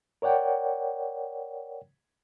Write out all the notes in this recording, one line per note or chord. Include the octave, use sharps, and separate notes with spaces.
A#4 C#5 D5 F#5 G5